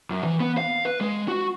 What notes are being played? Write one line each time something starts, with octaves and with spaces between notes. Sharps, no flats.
F#2
E3
B3
F5
B4
G#3
F#4